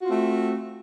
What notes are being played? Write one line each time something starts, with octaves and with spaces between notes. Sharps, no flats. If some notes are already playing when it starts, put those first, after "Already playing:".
A3 C4 F4 F#4